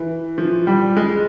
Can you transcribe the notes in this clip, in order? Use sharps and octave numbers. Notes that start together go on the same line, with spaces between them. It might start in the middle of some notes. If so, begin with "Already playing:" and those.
Already playing: E3
F3
G3
G#3